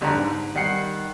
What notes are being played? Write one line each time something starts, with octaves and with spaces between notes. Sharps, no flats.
G1 D3 G3 A#5
G#2
D#3 G3 F#5 C7